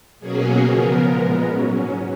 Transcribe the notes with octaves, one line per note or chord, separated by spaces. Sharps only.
B2 F#3 A#3 C#4 G#4
C#3 F3 B3 A#4
A#2 G#3 B3
G#2 F#3 C#4